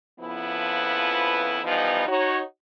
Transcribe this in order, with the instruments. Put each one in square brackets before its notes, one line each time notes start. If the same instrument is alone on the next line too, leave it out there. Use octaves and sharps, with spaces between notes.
[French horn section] F2 C#3 F3 B3 E4 B4
E3 F3 G3 B3 D#4 F4
D#4 F#4 C#5